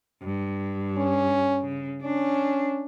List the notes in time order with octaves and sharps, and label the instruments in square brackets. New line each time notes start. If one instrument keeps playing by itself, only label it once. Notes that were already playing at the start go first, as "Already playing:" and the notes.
[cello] G2
[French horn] C#4
[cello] C#3
[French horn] C#4 [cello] D4